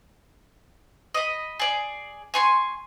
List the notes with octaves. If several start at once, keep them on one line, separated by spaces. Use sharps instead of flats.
D#5 B5
G#4 D5
G#5 C6 C#6